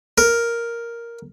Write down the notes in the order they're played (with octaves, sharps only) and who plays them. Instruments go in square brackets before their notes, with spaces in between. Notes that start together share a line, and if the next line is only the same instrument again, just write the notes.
[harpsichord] A#4